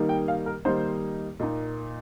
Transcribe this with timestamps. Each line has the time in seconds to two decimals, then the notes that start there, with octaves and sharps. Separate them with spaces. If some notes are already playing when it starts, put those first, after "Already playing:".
Already playing: D#3 G3 A#3 D#4
0.09 G5
0.28 F5
0.46 A#4
0.65 D#3 G3 A#3 D#4 C5
1.39 A#2 A#3 D#4 D#5